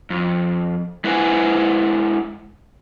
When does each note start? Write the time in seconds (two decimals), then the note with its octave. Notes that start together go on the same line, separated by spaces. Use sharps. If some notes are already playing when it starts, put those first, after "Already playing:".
0.10 F2
1.04 G#3 E4 B4 C5 F#5 G#5